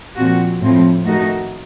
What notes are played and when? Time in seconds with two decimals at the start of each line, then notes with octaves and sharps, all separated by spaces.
0.16 A#2 F3 C4 F#4
0.60 A2 F3 C4
1.05 D#3 A3 D#4 F#4